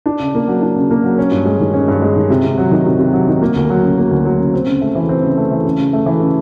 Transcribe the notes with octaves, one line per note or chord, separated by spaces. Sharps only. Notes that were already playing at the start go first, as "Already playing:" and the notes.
D4
C#3
A#3
F#3
D4
C#3
A#3
F#3
C#4
G2
G#3
D#3
C#4
G2
G#3
D#3
C3
C3
F#3
D#3
C3
C3
F#3
D#3
A#3
D2
F#3
C#3
A#3
D2
F#3
C#3
C4
C#3
A3
E3
C4
C#3
A3
E3
C#3
C#3
A3
E3
C#3